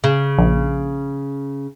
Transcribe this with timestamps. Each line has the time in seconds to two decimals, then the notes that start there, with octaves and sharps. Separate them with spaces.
0.04 C#3
0.38 A#1